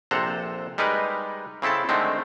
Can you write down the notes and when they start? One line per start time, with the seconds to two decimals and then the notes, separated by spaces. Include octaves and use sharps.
0.11 A#1 C3 A4 C5 F#5 A#5
0.78 G3 G#3 D#4 A#4 B4
1.62 C#3 C4 E4 A4 A5
1.89 D3 D#3 G#3 A3 C4